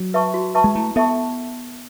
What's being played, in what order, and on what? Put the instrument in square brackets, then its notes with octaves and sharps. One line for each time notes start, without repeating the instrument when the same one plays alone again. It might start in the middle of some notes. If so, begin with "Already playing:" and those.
Already playing: [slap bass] F#3
[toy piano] B4 E5 A5 C#6
F#4
B4 E5 A5 C#6
[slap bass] G#3
[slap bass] A3 [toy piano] E4
[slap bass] B3 [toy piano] A4 E5 A5 C#6